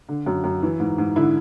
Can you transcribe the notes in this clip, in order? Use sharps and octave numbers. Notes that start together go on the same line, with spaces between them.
D3
F#2
F#2
E3
G#2
G#2
D3 E4